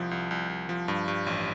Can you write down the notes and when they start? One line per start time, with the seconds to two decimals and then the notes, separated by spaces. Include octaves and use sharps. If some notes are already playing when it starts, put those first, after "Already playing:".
Already playing: C2 F3
0.11 C2
0.31 C2
0.49 C2
0.69 F3
0.88 G2
1.08 G2
1.27 A1